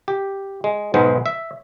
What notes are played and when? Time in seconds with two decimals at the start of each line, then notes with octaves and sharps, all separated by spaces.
0.08 G4
0.64 G#3
0.94 B1 G#2 G#3 B3 C5
1.26 E5